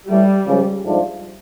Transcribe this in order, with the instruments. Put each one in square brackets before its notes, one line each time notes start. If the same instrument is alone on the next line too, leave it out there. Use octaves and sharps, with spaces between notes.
[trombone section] A2 E3 A3 [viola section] G3
[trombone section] C#2 C#3 F3
G#2 F3 A3 D4 F4